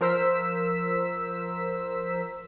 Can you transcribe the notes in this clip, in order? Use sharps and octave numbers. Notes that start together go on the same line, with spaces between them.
F3 A#4 C5 E6 B6